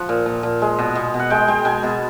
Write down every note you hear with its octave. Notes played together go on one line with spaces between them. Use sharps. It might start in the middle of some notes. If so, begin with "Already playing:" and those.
Already playing: F3 F#5
A#2
A#2
A#2
G#3
B2
B2
B2
F#5
G#3 G5
G#3 G5
B2 G#5
B2 A5